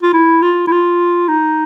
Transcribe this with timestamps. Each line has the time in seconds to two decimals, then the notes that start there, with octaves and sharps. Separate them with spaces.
0.03 F4
0.14 E4
0.42 F4
0.67 E4
0.72 F4
1.28 D#4